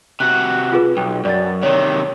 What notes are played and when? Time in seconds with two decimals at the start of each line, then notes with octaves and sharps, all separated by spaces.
0.20 C3 F#4 F#6
0.72 F4 G#4 B4
0.97 B1 G5
1.25 F#2 D5 A6
1.63 C3 D#3 C#5